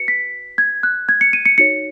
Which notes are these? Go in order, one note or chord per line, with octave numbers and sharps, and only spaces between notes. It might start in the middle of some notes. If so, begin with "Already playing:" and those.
Already playing: F#4 B4 C#7
B6
G#6
F#6
G#6
C#7
D#7
C#7
D#4 F#4 C#5 C#7